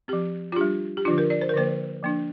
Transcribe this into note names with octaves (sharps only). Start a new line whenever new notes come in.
F3 C4 G4
F4
G3 D4 G4
G4
D3 F3 D4 F4
A#4
D5
C5
A#4
D3 F3 A#3 C5
F3 A#3 D4